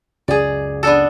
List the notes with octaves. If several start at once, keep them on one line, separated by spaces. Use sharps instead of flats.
C#2 F#2 G#4 D5
B3 D4 A4